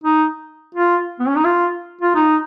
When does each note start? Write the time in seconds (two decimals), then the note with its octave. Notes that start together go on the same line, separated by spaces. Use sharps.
0.04 D#4
0.75 F4
1.20 B3
1.28 C#4
1.37 D#4
1.45 F4
2.01 F4
2.15 D#4